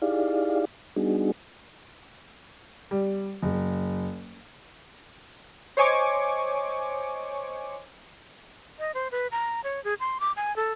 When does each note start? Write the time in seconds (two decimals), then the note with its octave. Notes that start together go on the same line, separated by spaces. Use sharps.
0.02 D#4 E4 G4 G#4 D5 F5
0.96 G3 B3 D4 D#4 F#4 G#4
2.91 G3
3.43 F#1
5.77 C5 C#5 D#5 G#5 C#6 D6
8.79 D#5
8.94 C5
9.12 B4
9.31 A#5
9.64 C#5
9.84 G#4
10.00 C6
10.20 D6
10.36 G#5
10.56 A4